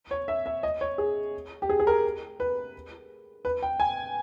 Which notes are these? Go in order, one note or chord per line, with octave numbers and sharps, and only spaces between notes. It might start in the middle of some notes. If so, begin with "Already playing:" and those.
C#5
E5
E5
D#5
C#5
G#4
G4
G#4
G#4
A#4
B4
B4
G5
G#5